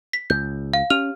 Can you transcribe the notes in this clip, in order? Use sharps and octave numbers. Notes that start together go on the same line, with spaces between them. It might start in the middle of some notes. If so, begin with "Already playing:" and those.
B6
C#2 G6
F5
C#4 G4 F6 F7